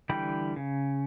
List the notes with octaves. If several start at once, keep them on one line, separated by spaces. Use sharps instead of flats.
D3 E3 G3 G5 B5
C#3